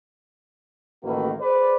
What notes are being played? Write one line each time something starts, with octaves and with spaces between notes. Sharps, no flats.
A1 D#3 A3 A#3 F#4 B4
G#4 B4 C5 D5